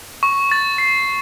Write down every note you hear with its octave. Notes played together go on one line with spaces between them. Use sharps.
C#6
A6
C7